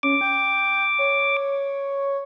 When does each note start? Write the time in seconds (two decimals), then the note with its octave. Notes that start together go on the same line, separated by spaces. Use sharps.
0.03 C#4 D6
0.21 G5
0.99 C#5